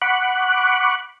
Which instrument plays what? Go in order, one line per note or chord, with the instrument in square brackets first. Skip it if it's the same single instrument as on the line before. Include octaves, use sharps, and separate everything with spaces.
[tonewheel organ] F#5 B5 C#6 D6 F#6